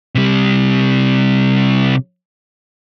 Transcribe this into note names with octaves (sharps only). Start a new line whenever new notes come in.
C3 G3